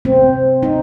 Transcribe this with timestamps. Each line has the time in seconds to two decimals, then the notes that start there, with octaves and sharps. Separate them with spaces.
0.05 C4
0.63 D#4